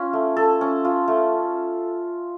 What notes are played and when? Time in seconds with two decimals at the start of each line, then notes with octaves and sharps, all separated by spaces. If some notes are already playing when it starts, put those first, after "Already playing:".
Already playing: C#4 F4
0.13 A3
0.37 A4
0.61 C#4
0.85 F4
1.08 A3